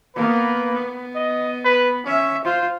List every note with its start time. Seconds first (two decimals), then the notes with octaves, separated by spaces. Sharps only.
0.15 A#3 B3 B4
0.74 B3
1.15 D#5
1.65 B4
2.06 C#4 E5
2.45 F4 C5